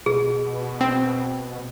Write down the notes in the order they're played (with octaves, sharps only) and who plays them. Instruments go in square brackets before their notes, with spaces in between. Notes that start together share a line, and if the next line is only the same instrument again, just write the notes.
[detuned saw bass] B2 [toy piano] G#4
[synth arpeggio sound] C4